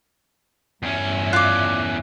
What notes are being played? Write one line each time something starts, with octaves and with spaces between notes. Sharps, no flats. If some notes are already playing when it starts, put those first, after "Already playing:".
E2 G2 C#4 E5
F4 D5 F#6